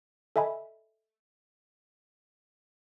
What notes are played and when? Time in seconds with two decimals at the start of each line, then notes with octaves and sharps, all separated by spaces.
0.36 A4 D#5 E5 G#5 B5